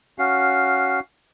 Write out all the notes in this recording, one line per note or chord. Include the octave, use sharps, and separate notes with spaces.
C#4 F#4 F5